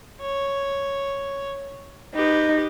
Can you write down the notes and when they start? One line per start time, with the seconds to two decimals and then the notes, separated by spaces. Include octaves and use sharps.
0.20 C#5
2.15 D#4 G4 B4